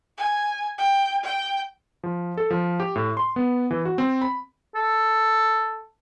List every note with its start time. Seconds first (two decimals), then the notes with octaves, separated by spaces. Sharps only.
0.18 G#5
0.78 G5
1.23 G5
2.04 F3
2.37 A4
2.50 F3
2.80 G4
2.96 A2
3.17 C6
3.36 B3
3.71 E3
3.85 F#4
3.98 C4
4.22 B5
4.75 A4